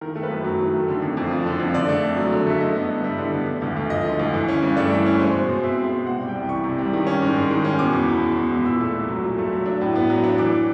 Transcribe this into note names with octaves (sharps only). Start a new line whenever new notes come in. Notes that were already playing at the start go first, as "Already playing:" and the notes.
D#3 A#4
A3
B4
F#2
F#3
D#3
A3
D3
F2
F2
F3
D3
F2
D3 D5
A3
F2
F#3
D3
A3 E5
D3 D#5
B3
G2
G3 E5
D3
B3
D3
D2
D2
F3 D#5
D3
D2
E3
C#4
G2
A3 D5
E3
C#4
G#3 C5
B2
B2
C4 E5
G#3
B2
C3 F#5
G3
G5
C2
E3 C#6
C3
G3
D#3
C#4
G#2
G#3
D#3
C#4
B2 D6
E2
E2
G#3
B2
E2
A#2 E6
A3
C2
F#3
A#2
A3
F#3
D4
A2
B3
F#3
D4
E3 D6